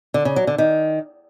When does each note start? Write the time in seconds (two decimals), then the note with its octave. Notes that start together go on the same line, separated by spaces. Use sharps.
0.14 D3
0.25 C#3
0.36 F#3
0.47 D3
0.58 D#3